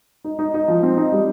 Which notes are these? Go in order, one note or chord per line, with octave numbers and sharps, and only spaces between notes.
D#4
D#4
D#4
F3
C4
D#4
G3